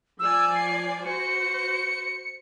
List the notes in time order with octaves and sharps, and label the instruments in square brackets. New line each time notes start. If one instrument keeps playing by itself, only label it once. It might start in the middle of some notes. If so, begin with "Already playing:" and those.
[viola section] F3 D5 G#5 [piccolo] E6
[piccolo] C7
[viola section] F#4 C5 [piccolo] C#7